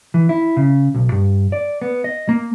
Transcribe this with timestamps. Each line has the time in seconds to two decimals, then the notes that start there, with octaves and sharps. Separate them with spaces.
0.14 E3
0.29 E4
0.57 C#3
0.94 B1
1.12 G2
1.52 D5
1.82 B3
2.04 D#5
2.29 A#3